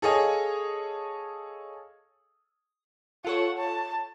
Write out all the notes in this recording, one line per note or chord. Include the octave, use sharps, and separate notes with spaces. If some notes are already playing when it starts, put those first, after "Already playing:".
G#4 A4 C#5 D#5 F5 G#5
F4 A4 C#5 F#5
A5